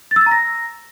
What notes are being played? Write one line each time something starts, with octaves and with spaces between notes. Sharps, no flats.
A6
E6
A6
A#5
A#6